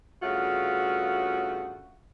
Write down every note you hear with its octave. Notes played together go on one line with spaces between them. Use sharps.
G2 C#3 A3 F4 F#4